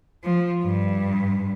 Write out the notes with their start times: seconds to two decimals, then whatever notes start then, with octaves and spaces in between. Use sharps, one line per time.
0.24 F3
0.64 G2